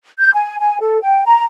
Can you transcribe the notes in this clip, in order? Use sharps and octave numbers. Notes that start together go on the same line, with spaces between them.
G6
G#5
G#5
A4
G5
A#5